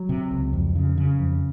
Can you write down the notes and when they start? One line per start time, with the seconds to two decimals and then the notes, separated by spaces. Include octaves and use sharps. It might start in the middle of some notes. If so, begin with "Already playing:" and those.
Already playing: F#3
0.09 C3
0.31 C#2
0.53 F2
0.75 C#3
0.97 C#3
1.19 F2